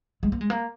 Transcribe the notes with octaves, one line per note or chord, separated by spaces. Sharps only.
G#3
A#3
G#3
A#3